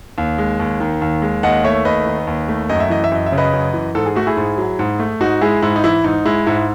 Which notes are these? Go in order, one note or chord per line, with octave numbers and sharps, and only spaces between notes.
D#2
G#3
D#2
D#3
D#2
G#3
D#2 D#5 F#5
A3 C#5 E5
D#2 B4 D#5
D#3
D#2
A3
F#2 D#5
E5
E3 D#5
E5
F#2 D#5
E5
C#3
B4 D#5
F#2
E3
G#2 A4
G#4
A3 F#4
E4 G#4
G#2
F#3
G#2
A3
G#2 D#4 F#4
G#3 E4 G#4
G#2 E4
D#4
E3 E4
G#2 D#4
G#3 E4
G#2 E4